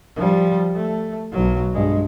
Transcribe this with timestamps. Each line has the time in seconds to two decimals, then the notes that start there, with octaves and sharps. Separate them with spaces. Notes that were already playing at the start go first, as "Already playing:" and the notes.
0.16 F3 G3
0.75 A3
1.32 B1 F#3
1.74 G2 G#3